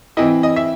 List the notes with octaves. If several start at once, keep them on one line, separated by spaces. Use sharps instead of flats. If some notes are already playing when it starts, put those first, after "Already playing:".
E3 C4 E4 D#5
D#5
E5